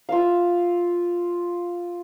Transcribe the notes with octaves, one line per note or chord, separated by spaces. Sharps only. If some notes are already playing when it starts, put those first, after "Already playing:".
F4 E5 F5